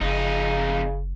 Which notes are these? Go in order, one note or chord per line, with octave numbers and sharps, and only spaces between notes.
F#1 F2 C#3 D#4